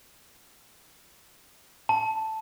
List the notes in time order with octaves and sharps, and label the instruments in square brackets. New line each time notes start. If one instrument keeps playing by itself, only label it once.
[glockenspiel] A5